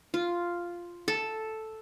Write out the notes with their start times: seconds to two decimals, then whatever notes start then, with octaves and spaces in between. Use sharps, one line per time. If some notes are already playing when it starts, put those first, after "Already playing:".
0.14 F4
1.08 A4